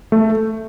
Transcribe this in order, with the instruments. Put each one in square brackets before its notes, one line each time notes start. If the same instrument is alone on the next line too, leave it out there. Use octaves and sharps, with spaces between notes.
[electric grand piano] A3